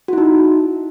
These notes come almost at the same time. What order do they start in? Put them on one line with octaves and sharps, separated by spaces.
F#4 E4 D#4